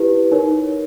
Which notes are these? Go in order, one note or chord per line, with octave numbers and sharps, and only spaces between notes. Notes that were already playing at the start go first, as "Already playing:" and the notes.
Already playing: E4 G4 B4
D#4 A#4 C#5